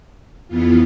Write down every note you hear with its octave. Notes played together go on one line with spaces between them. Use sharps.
F2 E3 B3 F4